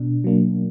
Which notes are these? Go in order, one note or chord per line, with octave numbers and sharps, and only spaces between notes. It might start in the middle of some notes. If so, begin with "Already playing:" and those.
Already playing: B2 D4
F#3 A#3 D4